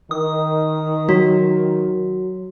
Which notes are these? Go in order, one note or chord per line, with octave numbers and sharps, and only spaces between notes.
D#3 D#6
F#3 F#4